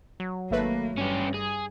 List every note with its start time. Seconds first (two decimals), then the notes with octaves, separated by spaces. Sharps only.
0.20 F#3
0.51 G#1 A3 A#3 B4
0.97 G2 C#4 G4
1.34 G#4